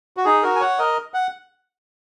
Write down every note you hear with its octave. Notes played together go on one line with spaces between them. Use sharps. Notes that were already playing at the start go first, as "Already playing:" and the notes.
F#4
D#4 G#4
F#4 A#4
G#5
C#5 F#5
A#4 D#5
F#5